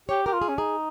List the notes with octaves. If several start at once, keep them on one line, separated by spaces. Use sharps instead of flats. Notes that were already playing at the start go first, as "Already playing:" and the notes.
G4 C#5
G4 A#4
F4
G#4
C#4
D#4 G#4